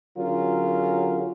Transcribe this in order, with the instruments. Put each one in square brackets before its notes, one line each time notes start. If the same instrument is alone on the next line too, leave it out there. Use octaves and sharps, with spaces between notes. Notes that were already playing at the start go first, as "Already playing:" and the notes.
[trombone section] D3 F#3 C#4 F4 G#4 A#4